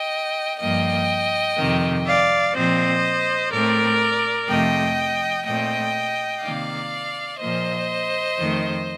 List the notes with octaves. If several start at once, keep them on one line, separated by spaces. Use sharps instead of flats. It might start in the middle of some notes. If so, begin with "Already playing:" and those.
Already playing: D#5 G5
G2 F3 A#3 D#5 G5
F2 C3 D#3
D5 F5
A#2 F3 C4 C5 D#5
A2 A3 C4 A#4 D5
F2 C3 F3 A3 D#5 G5
A#2 A3 C4 D#5 G5
C3 D#3 A#3 D5 F5
A#2 F3 A#3 C5 D#5
F2 D#3 A3